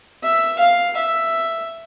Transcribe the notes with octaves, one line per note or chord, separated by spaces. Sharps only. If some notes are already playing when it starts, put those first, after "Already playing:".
E5
F5
E5